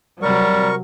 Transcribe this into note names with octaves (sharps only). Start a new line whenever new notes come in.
C3 F#3 G3 A#4 C#6